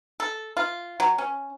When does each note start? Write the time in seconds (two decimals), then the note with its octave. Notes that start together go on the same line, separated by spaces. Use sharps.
0.20 A4
0.57 F4
1.00 F#3
1.18 C#4